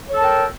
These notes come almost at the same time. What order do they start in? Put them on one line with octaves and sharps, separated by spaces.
C#5 A4 A5 A#4 G5